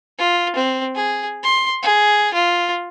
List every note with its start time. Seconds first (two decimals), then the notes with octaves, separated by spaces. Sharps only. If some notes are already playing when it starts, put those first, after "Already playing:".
0.18 F4
0.56 C4
0.95 G#4
1.43 C6
1.82 G#4
2.34 F4